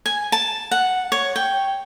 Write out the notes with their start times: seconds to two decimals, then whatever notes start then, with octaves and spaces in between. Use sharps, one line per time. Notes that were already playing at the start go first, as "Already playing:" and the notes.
0.06 G#5
0.32 A5
0.71 F#5
1.12 C#5
1.36 G5